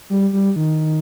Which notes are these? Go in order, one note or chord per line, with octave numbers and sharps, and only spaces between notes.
G3
G3
D#3